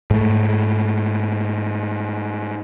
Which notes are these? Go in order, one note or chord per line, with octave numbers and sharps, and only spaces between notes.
G#2 A3